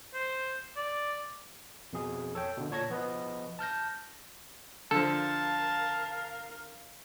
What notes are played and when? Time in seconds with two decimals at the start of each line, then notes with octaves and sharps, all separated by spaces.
0.14 C5
0.77 D5
1.93 F2 B2 G#4
2.35 A4 C#5 G5
2.57 B2 D3
2.71 A#2 C#5 A5 C#6 G#6 A#6
2.90 F3 B3 B4 D#5
3.59 A5 F6 G6 A#6
4.91 D3 F3 A4 A#4 F5 A5